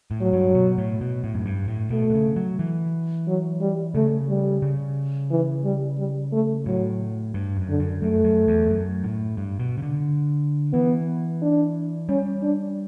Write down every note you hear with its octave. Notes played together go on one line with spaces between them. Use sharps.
A2
F#3
G2
B2
A2
B2
A2
F#2
G2
A2
B2 A3
B2
C#3
F#3
E3
F#3
G3
C#3 A3
G3
C#3
E3
G3
G3
A3
A2 F#3
G2
F#2
D3
F#2
F#2 A3
F#2
E2
F#2
A2
G2
B2
C#3
D3
E3 B3
D4
G3 C#4
D4